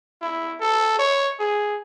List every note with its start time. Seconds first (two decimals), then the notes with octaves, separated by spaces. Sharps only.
0.22 E4
0.61 A4
0.99 C#5
1.40 G#4